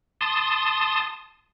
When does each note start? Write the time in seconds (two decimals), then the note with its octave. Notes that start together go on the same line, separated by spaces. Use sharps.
0.21 A5 C6 D#6